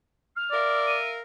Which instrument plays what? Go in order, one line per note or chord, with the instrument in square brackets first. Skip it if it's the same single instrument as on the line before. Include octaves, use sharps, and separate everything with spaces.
[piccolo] F6
[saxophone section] A#4 E5 F5 [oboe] D5
[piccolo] D#7